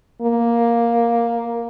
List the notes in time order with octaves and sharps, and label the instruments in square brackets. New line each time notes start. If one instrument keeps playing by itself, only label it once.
[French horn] A#3